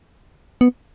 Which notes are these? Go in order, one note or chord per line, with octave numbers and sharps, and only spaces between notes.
B3